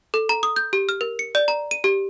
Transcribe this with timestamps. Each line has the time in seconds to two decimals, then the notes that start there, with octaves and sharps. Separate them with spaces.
0.14 A4
0.29 A#5
0.43 D#6
0.56 G6
0.73 G4
0.89 F6
1.01 A#4
1.19 C#7
1.35 D5
1.48 A#5
1.71 D#7
1.84 G4